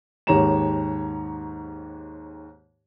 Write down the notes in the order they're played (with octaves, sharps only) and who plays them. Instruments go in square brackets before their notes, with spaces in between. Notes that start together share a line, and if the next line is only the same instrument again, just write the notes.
[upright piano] D#2 G#2 G4 C#5 A#5 E7